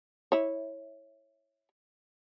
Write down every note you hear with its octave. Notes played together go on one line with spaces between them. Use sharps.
E4 C#5